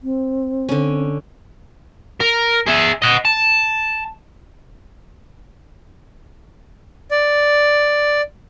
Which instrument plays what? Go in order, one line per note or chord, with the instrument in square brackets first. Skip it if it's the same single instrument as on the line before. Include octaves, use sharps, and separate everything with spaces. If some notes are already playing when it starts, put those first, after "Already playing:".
[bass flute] C4
[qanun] D3 C#4
[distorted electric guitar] A#4
G#4 E5
D#5 F#5
A5
[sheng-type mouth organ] D5